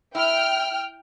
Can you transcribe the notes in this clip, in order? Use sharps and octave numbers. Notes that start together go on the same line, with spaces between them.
E4 G5 F6